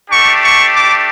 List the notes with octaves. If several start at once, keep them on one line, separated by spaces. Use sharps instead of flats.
A3 D4 G4 C#6
C#6
D6